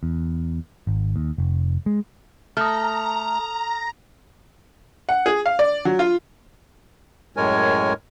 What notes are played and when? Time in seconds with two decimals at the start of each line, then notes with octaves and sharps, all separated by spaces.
0.03 E2
0.87 G#1
1.16 D#2
1.38 F1
1.86 G#3
2.57 A3 A#5 D#6 F6
5.09 F#5
5.26 G#4
5.46 F5
5.59 D5
5.85 F#3
5.99 F4
7.37 F#2 A2 G#3 A#4 C#5 G#5